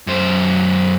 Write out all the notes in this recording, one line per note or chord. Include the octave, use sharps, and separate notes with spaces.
F#2 C5